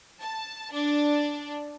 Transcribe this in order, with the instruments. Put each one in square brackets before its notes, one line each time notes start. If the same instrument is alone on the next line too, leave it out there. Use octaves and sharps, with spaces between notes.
[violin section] A5
D4